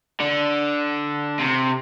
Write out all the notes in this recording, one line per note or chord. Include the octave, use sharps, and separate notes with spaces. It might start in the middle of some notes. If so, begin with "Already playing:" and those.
D3
C3